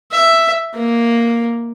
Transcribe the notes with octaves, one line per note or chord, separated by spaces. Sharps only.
E5
A#3